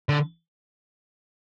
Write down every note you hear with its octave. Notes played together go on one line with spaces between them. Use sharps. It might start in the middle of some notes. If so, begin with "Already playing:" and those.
D3